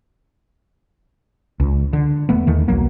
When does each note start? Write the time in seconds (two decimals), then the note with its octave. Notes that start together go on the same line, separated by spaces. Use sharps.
1.60 C#2
1.93 D3
2.29 E1 A3 B3
2.47 D#2 D#3 A3
2.68 D#1 B1 F#3 A#3